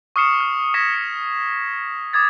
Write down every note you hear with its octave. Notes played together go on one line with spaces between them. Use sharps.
C#6 D#6 F6 C7 C#7 E7
F6
C#6 D#6 G#6 A#6 B6 E7
C#7
D6 D#6 G#6 A6